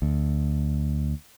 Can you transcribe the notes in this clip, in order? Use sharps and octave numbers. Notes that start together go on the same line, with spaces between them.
D2